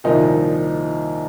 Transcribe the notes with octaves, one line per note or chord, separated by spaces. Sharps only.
C2 A#2 D#3 F3 D#4